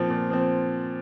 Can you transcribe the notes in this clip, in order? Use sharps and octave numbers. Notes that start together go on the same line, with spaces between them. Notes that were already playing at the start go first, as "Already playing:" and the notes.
Already playing: A#2 F3 C4
A#2
F3 C4